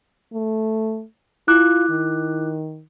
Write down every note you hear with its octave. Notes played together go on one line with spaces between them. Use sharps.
A3
E4 F4 D6 F#6
D#3